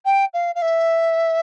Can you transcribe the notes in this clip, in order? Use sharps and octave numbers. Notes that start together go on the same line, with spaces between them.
G5
F5
F5
E5